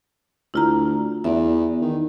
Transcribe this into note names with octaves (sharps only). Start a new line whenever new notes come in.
D2 E4 F4 A#5
E2 D5 E5
D#3